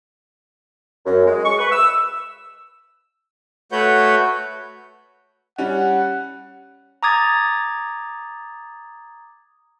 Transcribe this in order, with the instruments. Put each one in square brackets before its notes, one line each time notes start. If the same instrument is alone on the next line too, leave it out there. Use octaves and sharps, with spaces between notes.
[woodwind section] F#2
G#3
C#6
B4
E6
[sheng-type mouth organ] A3 F#4 B4 C#5 F#5 G6
[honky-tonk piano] G3 C#4 [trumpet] F#5
[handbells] A#5 D6 D#6 G#6 A6